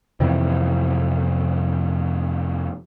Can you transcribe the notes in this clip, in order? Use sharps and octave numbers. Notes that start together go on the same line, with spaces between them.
F2 C3 D#3 E3